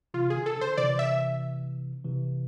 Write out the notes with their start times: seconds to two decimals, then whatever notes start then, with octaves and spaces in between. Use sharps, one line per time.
0.14 C3 E3 F4
0.30 G#4
0.36 D3
0.46 A4
0.57 D3 C5
0.78 C3 E3 D5
0.99 E5
2.05 C3 E3